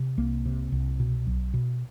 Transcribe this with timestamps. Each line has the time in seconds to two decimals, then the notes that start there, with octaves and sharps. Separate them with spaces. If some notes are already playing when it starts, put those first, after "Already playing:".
Already playing: C3
0.18 C2 A#3
0.45 C3
0.72 C2
1.00 B2
1.27 B1
1.54 B2